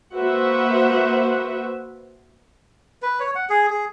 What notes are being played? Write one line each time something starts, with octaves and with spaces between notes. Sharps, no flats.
A#3 F#4 B4 C5 E5 F#5
B4
C#5
F#5
G#4
G#4